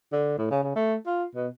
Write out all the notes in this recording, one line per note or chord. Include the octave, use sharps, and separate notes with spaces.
D3
A2
C#3
C#3
A3
F4
B2